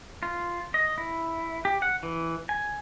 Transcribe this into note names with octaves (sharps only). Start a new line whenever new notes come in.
F4
D#5
E4
G4
F#5
E3
G#5